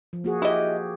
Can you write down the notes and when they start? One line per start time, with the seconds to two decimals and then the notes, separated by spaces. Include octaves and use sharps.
0.13 F3
0.24 A#3 F#4 G#4
0.42 E4 G4 D#5